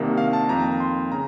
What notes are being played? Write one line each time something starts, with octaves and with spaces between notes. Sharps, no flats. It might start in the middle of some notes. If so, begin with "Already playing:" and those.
Already playing: C2 C3 D#3 A#3
F5
A5
F2 D#3 A#3 A#5
C6
C#3 A#5